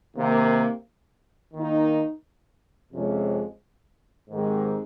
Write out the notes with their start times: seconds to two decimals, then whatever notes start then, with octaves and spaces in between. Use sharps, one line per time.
0.16 C3 D#3 A#3
1.54 D#3 A#3 D#4
2.92 F2 C3 F3 G#3 C#4
4.30 G#2 D#3 G#3 C4 G4